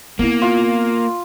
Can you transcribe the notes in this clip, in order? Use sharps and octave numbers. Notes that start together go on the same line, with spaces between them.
A#3 B3 E4
F4